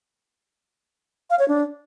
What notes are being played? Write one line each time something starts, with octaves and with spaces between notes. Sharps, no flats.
F5
C#5
D4